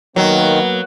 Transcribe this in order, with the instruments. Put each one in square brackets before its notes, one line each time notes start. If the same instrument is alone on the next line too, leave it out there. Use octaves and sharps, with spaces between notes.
[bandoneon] D#3 [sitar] F#3 [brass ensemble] A#3 B3